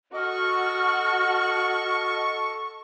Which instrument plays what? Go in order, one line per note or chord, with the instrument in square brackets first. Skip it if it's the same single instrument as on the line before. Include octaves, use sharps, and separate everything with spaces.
[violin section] F#4 [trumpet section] A4 C#6 [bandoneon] D#5 [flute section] F6